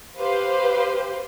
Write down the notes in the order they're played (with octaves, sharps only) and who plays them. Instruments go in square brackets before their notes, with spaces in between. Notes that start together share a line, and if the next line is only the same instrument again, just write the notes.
[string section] G4 B4 C5 F5